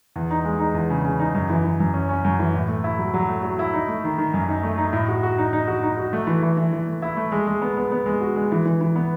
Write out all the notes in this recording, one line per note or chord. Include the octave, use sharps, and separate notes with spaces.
E2
D#4
G#3
D#4
E2
C#3
C#3
D#4
F#2
E3
E3
F#2
C#4
C#4
F#2
E3
A2
A3
E4
F#3
F#3
A3
F#3
E4
D#4
A3
D#3
D#3
F#2
D#4
A3
D#4
A2
F#4
F#4
D#4
D#4
F#4
D#4
F#4
A3
E3
E3
E3
E3
A3
E4
A3
G#3
G#3
B3
B3
B3
G#3
F#4
G#3
E3
E3
E3
B3